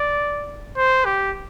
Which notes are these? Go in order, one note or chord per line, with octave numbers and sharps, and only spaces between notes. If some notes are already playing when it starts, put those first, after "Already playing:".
Already playing: D5
C5
G4